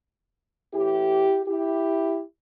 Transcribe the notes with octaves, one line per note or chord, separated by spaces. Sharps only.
A2 E3 E4 G4
E4 G4